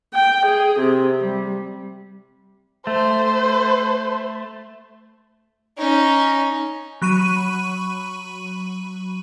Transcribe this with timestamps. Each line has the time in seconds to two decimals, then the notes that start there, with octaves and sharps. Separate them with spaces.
0.13 G5
0.45 G#4
0.80 C3
1.21 G3
2.87 A3 C5
5.78 C#4 D#4
7.02 F#3 B5 C#6 D#7